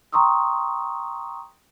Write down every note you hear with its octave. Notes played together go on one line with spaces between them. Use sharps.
G5 A#5 C6 C#6 D#6 E6